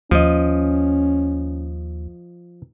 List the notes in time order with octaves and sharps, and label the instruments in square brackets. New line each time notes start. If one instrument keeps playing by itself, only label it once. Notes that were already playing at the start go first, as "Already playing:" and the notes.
[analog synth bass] D#2 [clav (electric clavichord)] F3 D#5 [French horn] C#4